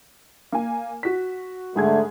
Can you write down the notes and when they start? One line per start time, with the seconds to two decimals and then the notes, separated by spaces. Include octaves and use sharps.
0.52 A#3 G#5
1.03 F#4 B6
1.76 G#2 D3 A3 G#4 G#6